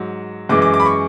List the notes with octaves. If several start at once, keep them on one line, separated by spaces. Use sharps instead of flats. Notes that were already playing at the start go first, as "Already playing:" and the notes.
Already playing: G#2 F#3
F#2 E3 G#3 D6
D6
D6
B5
C#6